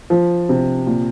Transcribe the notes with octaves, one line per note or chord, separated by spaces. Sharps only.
F3
C3
A#2